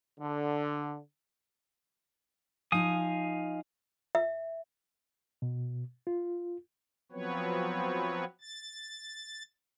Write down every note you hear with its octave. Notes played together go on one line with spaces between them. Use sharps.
D3
F3 D#4 F5 G#5 D#6
E5
B2
F4
F3 F#3 B3 C4 B4 C#5
A6